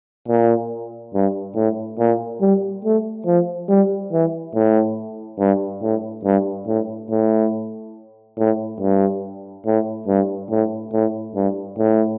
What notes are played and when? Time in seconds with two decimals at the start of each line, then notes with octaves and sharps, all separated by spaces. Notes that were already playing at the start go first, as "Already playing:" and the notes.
0.28 A#2
1.14 G2
1.56 A2
1.99 A#2
2.41 G3
2.85 A3
3.26 F3
3.69 G3
4.12 E3
4.55 A2
5.39 G2
5.82 A2
6.24 G2
6.67 A2
7.10 A2
8.38 A2
8.80 G2
9.66 A2
10.08 G2
10.50 A2
10.93 A2
11.35 G2
11.78 A2